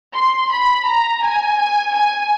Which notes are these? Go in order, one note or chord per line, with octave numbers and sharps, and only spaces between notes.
C6
B5
A#5
G#5
G#5
G#5